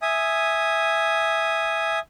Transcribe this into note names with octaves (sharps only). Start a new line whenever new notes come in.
E5 G#5 D#6